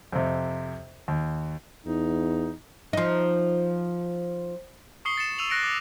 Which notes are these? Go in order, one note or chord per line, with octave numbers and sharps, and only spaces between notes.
F2 C3
D#2
E2 D#4
F3 D#4
C#6 D#6 C7 C#7 G7
A6 C#7 E7
E6 D#7 F7 F#7
F#6 A#6 C#7 D7
D6 C#7